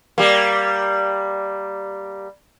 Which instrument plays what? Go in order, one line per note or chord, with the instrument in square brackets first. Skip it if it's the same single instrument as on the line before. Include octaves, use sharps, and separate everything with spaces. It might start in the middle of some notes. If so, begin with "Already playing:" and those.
[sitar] G3 A#3